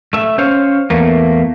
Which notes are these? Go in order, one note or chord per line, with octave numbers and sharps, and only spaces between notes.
A3 E5
C#4 C5 C#5 F5
E2 A3 A#3